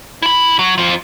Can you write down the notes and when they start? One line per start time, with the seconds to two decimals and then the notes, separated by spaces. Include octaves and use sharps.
0.22 E4 B5
0.59 F#3
0.78 F2 F3